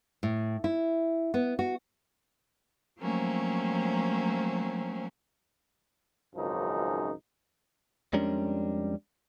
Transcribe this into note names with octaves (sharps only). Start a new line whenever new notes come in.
A2
E4
B3
F#4
F3 F#3 A3 A#3 C4 C#4
G#1 C#2 F#2 F3 D#4
F2 G3 G#3 C#4 D4 A#4